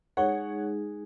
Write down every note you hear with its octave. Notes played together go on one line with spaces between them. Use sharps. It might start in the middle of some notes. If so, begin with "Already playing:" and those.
G#3 D#4 G#4 C#5 F#5